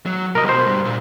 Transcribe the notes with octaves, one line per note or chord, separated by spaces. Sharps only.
F#3
C2 A#4 D#5
B2 C5
G2
A#2